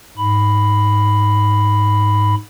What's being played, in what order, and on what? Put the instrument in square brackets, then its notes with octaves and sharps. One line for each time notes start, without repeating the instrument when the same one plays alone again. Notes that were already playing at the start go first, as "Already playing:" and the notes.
[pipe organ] G#2 B5